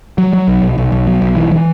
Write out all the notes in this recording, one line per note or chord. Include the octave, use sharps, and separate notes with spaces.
F#3
F#3
B1
B1
B1
B1
F#3
B1
E3
E3